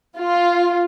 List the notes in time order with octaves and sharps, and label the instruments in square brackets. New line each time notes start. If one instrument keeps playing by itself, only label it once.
[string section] F4